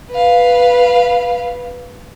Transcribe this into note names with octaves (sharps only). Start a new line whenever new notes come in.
B4 F5